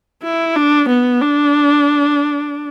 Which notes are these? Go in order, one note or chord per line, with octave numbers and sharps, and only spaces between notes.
E4
D4
B3
D4